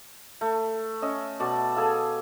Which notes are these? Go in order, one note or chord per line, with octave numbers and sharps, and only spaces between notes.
A3
C#4 D#5 E5
B2 D5 A5 C#6
G#4 A4 F5